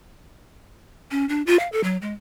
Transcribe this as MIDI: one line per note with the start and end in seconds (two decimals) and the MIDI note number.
1.11 1.27 61
1.29 1.42 62
1.47 1.59 65
1.59 1.68 77
1.72 1.83 69
1.84 1.97 54
2.02 2.13 56